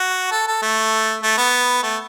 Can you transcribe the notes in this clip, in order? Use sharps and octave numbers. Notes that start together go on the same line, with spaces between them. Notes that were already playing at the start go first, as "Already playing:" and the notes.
Already playing: F#4
A4
A4
A3
A3
B3
A3